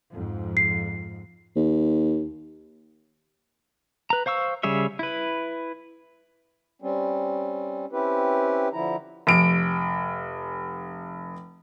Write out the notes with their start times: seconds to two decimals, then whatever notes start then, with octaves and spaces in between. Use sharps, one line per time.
0.12 F2 G#2
0.57 C7
1.56 D#2
4.10 B4 A#5
4.26 C5 F5 C#6 E6
4.63 C#3 G3 G#4 C#5 E5
4.99 E4 B4
6.82 G3 C4 C#4
7.92 C4 C#4 E4 G4 B4
8.73 D3 F3 E4 A#5
9.27 F1 D7